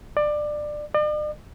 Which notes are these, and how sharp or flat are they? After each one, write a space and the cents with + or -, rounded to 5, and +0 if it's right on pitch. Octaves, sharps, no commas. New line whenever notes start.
D5 +20
D5 +45